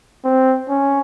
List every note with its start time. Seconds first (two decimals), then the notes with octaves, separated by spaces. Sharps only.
0.25 C4
0.69 C#4